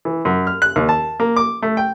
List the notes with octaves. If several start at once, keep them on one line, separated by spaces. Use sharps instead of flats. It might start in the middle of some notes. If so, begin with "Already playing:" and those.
E3
F#2
F6
F#6
D#2
A5
A#3
D6
A3
G5